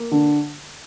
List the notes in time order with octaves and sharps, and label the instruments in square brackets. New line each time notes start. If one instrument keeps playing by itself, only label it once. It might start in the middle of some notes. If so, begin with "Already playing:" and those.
Already playing: [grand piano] A#3
D3